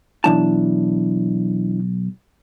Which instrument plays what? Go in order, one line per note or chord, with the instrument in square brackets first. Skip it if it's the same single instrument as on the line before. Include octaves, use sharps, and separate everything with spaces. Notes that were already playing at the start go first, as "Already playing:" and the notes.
[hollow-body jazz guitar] B1 G#3 A5 [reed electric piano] E3 D4 E4